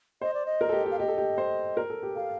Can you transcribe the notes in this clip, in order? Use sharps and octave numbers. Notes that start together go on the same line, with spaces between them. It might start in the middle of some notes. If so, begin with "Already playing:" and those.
C5 D#5
D5
D#5
A#4
A4
G4
G4
F5
G4 D#5
A4
G4
C5
A#4
A4
G4
A4 F5